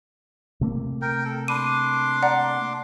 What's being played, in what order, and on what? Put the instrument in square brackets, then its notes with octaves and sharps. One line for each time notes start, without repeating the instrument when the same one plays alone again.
[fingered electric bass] C3 A3 A#3
[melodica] A#4 G5
A4
[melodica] D4 C6 D6 [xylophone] B5 D#7
[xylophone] D5 F#5 A#5